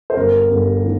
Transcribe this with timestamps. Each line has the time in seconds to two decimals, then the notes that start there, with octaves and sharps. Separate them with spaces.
0.10 C5
0.17 G1 A#4
0.50 G1
0.84 D#3